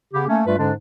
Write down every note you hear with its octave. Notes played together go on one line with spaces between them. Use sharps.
C#3 B3 G4
A3 A#3 C#4
G2 G3 A3 F4 B4
G#2 D3 G#3 C#4 D4